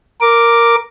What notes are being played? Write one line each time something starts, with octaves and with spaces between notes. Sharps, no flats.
A#4 D6